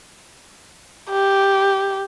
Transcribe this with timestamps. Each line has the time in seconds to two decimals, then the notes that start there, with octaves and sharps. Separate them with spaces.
1.11 G4